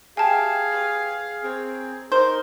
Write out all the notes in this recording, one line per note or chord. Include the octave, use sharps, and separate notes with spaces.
G4 G#4 E5 F5 G#5 A5
G4 B4 C#5
C4 G#4 A#4 C#5
D#4 A#4 C5